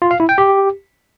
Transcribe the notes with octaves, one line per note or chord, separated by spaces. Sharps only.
F4
F5
E4
G5
G4